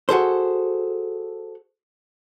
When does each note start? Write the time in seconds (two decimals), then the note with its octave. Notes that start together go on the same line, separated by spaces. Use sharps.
0.09 F#4 G#4 A4 C5